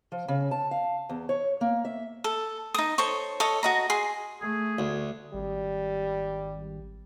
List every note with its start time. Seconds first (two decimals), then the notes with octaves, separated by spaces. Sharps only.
0.12 F3
0.28 C#3
0.51 A5
0.71 F5
1.09 E2
1.29 C#5
1.61 A#3
1.85 E5
2.24 A4
2.74 D#4 D#6
2.98 A4 C5 C#5 C#6
3.40 A4 C#5 D#5
3.63 F#4 D#5 A#5
3.90 G#4 C6
4.41 A3 G#4
4.79 D2
5.34 G#1 G3